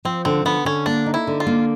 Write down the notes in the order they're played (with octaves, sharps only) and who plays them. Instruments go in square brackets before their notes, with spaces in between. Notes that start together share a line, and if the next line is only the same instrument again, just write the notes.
[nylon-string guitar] F3 [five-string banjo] C4
[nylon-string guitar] D3 [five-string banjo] C4
[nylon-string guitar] D3 [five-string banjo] B3
[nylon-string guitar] D3 [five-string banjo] C#4
[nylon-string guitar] A#3 [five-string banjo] D4
[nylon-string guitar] D#4
[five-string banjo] E4
[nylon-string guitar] D3
[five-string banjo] F4
[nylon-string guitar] A#3